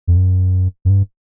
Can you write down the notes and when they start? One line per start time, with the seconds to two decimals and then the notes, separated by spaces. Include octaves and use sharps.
0.07 F2
0.17 F#2
0.85 F#2
0.90 G2